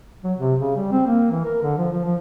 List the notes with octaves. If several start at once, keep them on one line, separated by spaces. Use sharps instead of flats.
F#3
C3
C#3
G3
C4
A#3
E3
A#4
D3
F3
F3
F3